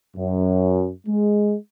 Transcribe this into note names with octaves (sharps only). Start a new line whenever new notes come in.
F#2
G#3